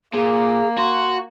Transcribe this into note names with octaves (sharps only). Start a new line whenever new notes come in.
A#2 A#3 G#4
F#4 C6